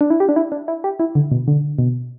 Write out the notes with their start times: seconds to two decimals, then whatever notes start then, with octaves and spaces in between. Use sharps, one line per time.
0.01 D4
0.10 E4
0.20 G4
0.29 D4
0.36 E4
0.52 D4
0.68 E4
0.84 G4
1.00 E4
1.15 D3
1.31 B2
1.48 D3
1.79 B2